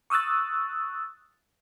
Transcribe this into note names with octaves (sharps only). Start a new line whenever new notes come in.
C#6 D#6 E6 F#6 A6